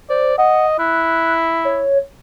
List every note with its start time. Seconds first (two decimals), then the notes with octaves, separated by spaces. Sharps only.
0.10 C5 D5
0.38 D#5 F#5
0.79 E4 F#6
1.65 C#5